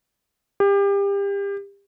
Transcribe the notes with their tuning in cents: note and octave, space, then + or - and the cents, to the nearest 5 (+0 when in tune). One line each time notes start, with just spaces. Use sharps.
G4 +30